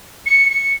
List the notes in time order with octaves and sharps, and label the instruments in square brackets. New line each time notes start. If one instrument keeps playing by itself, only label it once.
[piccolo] C#7
C#7